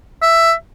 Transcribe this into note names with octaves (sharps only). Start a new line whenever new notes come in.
E5